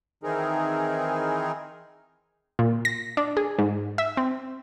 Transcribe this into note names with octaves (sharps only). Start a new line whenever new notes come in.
D#3 E3 C4 D#4 G#4 A#4
A#2
A#6
D4
G#4
G#2
E5
C4